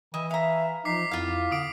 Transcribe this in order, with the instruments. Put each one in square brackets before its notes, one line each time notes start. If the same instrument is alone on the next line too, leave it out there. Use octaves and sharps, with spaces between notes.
[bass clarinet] E3 [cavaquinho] D#5 E5
[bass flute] E5 [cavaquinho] F5 A#5
[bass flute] F3 [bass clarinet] D#4 [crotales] D6 B6 C7
[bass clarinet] F2 [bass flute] E4 [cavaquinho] F4 F5
[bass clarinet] D3 [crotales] D6 D#6 D7